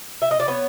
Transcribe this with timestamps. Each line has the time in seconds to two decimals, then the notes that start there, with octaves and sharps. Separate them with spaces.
0.22 E5
0.31 D#5
0.40 D5
0.48 B3 C#5